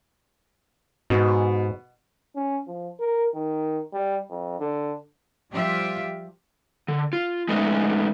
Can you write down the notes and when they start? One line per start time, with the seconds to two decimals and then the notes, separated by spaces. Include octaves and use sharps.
1.10 G#2 B2
2.36 C#4
2.68 F3
2.99 A#4
3.35 D#3
3.93 G3
4.30 F2
4.60 D3
5.52 F3 G3 F4 G4 E5
6.88 D3
7.13 F4
7.49 G#3 A3 B3 C#4 D#4